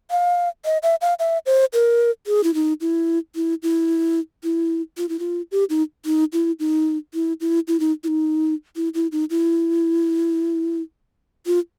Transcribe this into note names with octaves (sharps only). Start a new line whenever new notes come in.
F5
D#5
E5
F5
E5
C5
A#4
G#4
E4
D#4
E4
E4
E4
E4
F4
E4
F4
G4
D#4
D#4
E4
D#4
E4
E4
E4
D#4
E4
D#4
E4
E4
D#4
E4
F4